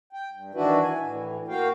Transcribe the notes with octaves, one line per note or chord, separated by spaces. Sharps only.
G5
G2
D#3 E3 D4 E4 F#4 B4
G#5
A2 E3
A#3 F#4 F5 G5